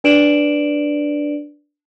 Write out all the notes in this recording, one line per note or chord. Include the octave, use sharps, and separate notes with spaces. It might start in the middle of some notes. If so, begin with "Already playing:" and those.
D4 B4 D5 D7 E7 F#7